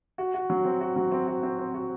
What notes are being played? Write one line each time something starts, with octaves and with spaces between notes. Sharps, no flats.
F#4
F#4
F#3
C4
F#4
F#3
C4
F#4
C4
C4
F#4